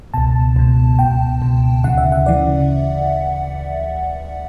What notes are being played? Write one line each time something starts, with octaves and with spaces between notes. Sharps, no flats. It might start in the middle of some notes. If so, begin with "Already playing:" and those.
C#2 B2 A5
C#2 B2
C#2 B2 G5
C#2 B2
D2 C#3 E3 F#5
E5
F#5
C#3 E3 D5